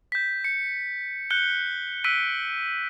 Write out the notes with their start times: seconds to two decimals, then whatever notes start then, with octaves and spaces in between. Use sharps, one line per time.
0.12 G6 B6
0.44 C#7
1.30 F#6 G6 C#7 G7
2.04 E6 F#6 B6 D7 D#7